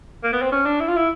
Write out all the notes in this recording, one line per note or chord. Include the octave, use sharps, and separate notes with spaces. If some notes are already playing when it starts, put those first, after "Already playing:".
A#3
B3
C4
C#4
D4
E4
F4
E4